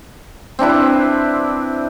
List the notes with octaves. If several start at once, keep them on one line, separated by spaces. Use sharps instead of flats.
C4 D4 E4 B4